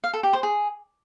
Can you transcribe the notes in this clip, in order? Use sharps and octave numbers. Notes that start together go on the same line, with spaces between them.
F5
A4
G4
C5
G#4